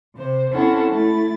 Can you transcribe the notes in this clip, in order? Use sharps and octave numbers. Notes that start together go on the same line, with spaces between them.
C3 C5
C4 C#4 E4 A4 F#5
A3 E4 A6